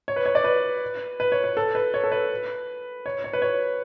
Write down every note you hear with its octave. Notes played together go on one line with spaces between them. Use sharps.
C#5
B4
C#5
D5
B4
B4
C#5
B4
A4
B4
C#5
A4
B4
C#5
C#5
B4
C#5